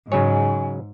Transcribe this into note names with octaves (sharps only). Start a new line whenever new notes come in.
G#2 C#3 F#3 C#5 G#5